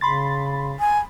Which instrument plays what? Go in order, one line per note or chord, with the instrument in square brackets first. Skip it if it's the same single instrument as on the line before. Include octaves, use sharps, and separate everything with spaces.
[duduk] C#3 [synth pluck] B5 C6 A6
[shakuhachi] G#5